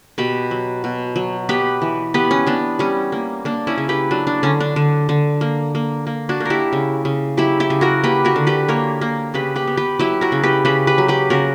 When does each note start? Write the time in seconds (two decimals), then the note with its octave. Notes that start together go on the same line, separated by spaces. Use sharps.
0.18 B2 G4 B4
0.51 F#3
0.84 B2
1.16 F#3
1.49 B3 G4 B4
1.82 E3
2.14 B3 G4 B4
2.31 C#4
2.47 B3 D4
2.79 G3 C#4
3.12 A#3
3.45 A#3 D4
3.67 C#4 E4
3.78 C#3
3.89 G4 B4
4.11 F#3 D4
4.27 D4
4.43 D3 C#4
4.60 D4
4.76 D3
5.09 D3
5.41 A#3
5.75 A#3
6.07 A#3
6.29 D4 F#4
6.40 A#3
6.45 E4 G4 A#4
6.73 C#3
7.05 C#3
7.37 F#3 E4 G4
7.60 E4 G4
7.70 C#3
7.81 F#4 A#4
8.03 A#3 G4 B4
8.25 F#4 A#4
8.36 D3
8.47 G4 B4
8.68 A#3 A#4 C#5
9.01 A#3
9.34 C#3 G4 B4
9.56 G4 B4
9.67 B3
9.77 G4 B4
9.99 F#3 E4 G4
10.21 F#4 A#4
10.32 C#3
10.43 G4 B4
10.65 C#3 G4 B4
10.87 G4 B4
10.98 F#3
11.08 G4 B4
11.30 C#3 F#4 A#4